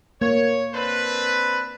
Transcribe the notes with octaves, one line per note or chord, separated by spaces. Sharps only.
A#3 C#5
C4 D4 B4